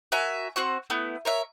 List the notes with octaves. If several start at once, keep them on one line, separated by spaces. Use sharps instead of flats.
F#4 A#4 E5 G#5
C4 F#4 C#6
A3 B3 E4
A#4 C#5 E5